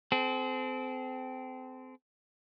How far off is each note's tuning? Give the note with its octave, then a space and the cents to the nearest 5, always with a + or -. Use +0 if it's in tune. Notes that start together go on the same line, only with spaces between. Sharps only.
C4 -25 A4 -45